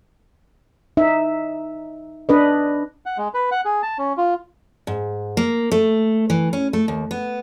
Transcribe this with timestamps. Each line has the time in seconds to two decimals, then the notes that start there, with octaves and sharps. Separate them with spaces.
0.97 D#4 E5
2.29 D4 B4 D#5
3.06 F#5
3.18 G#3
3.34 B4
3.51 F#5
3.65 G#4
3.82 A5
3.98 C#4
4.17 F4
4.87 G#2
5.37 A#3
5.72 A3
6.30 E3
6.53 C#4
6.73 A3
6.88 D#2
7.11 B3